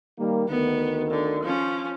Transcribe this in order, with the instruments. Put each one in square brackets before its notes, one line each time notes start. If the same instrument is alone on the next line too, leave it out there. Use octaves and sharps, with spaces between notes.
[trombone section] D#3 G3 A#3
[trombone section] D2 D#3 [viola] B3
[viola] D3
F3 C#4